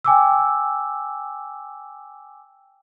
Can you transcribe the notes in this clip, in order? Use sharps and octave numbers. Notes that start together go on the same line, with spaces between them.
G5 G#5 D6 E6